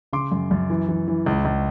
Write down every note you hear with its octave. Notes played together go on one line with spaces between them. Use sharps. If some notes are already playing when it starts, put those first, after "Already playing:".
C#3 C6 D6
F#2
F#2
E3
E3
E3
C#2
C#2